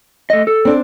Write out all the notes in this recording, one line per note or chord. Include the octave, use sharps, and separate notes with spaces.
A3 D#5
A4
C4 D4